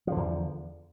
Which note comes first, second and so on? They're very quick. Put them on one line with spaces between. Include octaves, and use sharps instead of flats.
F3 D3 E2